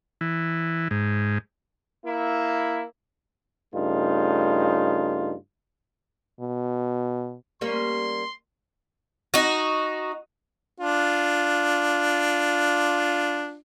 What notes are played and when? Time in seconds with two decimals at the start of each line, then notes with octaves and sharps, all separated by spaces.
0.21 E3
0.91 G#2
2.05 A#3 E4
3.74 G2 C#3 A3 D#4 F4
6.40 B2
7.61 G3 A#3 C#4 C6
9.34 D#4 F#4
10.80 D4 F4